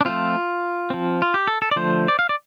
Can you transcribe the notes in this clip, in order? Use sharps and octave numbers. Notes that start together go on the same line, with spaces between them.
D4
F3 A3 C4 F4
F3 C4
F4
G4
A4
A4
D5
D3 F3 A3 C5
D5
F5
D5